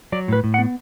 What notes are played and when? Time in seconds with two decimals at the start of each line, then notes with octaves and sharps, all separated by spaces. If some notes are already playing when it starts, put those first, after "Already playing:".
0.12 F#3 D5
0.28 A2 B4
0.44 A2
0.54 F#5
0.59 B3